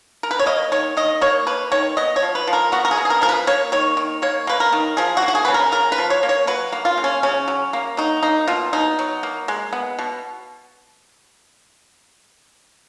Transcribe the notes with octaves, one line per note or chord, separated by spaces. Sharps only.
A#4
B4
C#5
A#3 D#5
D#3 C#5
D#3 D#5
A#3 C#5
A#3 B4
D#3 C#5
B3 D#5
C#5
F3
B4
F3
A#4
B3 F#4
A#4
G#4
B3
G#4
A#4
F3 A#4
B4
A#3 C#5
D#3 C#5
D#3
A#3 C#5
A#3 B4
A#4
D#3
F3 G#4
F#4
A#3
F#4
G#4
C#3 B4
A#4
C#3 A#4
B4
F3
C#5
A#3
C#5
F#3 B4
A#3
F4
C#3
C#4
C#3 C#4
F#3
A#3
F#3 D#4
A#3 D#4
B2 F4
B2 D#4
F#3
A#3
G#3
B3
B2